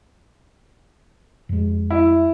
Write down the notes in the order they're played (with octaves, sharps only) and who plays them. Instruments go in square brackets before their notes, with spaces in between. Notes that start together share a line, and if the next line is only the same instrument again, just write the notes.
[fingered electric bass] F2 G#3
[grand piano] E4